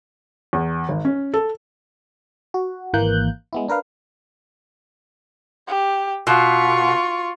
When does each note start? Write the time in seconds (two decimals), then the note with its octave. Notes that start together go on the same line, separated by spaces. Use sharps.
0.53 E2
0.89 G#1
1.05 C#4
1.34 A4
2.54 F#4
2.93 G#1 E3 A#3 F#6 G6
3.53 G#3 B3 E4
3.68 D4 A#4 B4 F5
5.67 G4
6.27 B2 F4 C#6